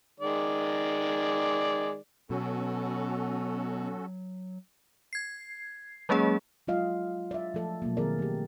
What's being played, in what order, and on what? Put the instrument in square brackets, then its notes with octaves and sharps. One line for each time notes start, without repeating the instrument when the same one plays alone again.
[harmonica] D#3 G#3 D5
[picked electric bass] B2 [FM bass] F#3 [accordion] C#4 F#4 A4
[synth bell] G#6 C7
F#3 G#3 A#3 C#4 G#4
[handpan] F#3 G#3 F4 D#5 F5
D5 E5
F3 A3 A4 D5
B2 F#3 A#3
D#3 C4 G#4 A#4 D5
A3 G4